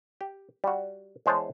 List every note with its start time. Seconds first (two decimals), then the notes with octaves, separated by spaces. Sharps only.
0.21 G4
0.64 G3 F#4
1.26 E2 G#3 C5 C#5 A5